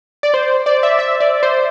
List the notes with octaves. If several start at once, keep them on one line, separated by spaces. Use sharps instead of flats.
D5
C5
D5
E5
E5
D5
C5